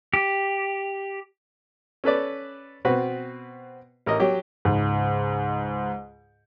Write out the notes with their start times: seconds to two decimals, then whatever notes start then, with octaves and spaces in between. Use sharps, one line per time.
0.14 G4
2.04 C#4 A4 B4 D5
2.85 B2 C4 F#4 B4
4.06 A1 A#4 D#5
4.20 F#3 G4
4.65 C#2 G#2